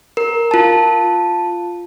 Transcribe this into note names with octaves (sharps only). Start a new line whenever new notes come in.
A#4
F4 A5